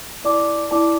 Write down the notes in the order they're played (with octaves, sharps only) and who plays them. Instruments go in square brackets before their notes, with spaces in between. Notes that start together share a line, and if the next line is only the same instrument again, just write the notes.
[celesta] E4 D5 A5 D6
E4 D5 A5 D6